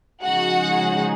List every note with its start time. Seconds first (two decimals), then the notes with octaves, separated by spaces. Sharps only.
0.22 C#3 F3 G#3 D#4 F#4 G#4 F#5